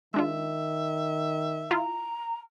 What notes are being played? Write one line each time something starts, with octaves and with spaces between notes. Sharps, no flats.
D#3 G#3 D4 F4 E5
E4 F4 A#5